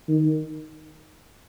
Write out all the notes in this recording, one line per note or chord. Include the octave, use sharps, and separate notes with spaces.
D#3